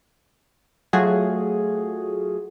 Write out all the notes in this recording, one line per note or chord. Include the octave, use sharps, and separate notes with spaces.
F#3 A3 F4 F#4 G#4